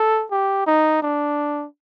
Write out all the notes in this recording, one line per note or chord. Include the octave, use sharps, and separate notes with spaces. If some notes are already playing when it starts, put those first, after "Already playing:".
Already playing: A4
G4
D#4
D4